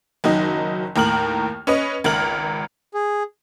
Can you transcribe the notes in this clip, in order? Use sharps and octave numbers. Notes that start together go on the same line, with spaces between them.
F#1 D#3 F#3 D#5
D#2 A2 A#4 F6 F#7
C#4 B4 D#5
G#1 C#2 A#4 F6 F#7
G#4